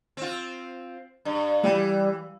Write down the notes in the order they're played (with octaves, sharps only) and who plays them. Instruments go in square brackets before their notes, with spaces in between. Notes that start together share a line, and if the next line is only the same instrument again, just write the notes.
[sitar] C4 F4
G2
[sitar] E3 [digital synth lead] G3